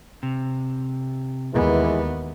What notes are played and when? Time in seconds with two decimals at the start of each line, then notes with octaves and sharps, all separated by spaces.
0.23 C3
1.54 D#2 E3 G#3 B3